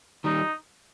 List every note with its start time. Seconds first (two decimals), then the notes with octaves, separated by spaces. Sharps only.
0.24 D#3 G3 D#4